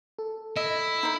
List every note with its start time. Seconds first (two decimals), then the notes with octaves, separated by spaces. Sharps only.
0.19 A4
0.56 E4 D#5
1.03 D#4 C5